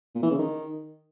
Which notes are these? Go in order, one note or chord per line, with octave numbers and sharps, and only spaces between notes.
A#2
E3
C#3
D#3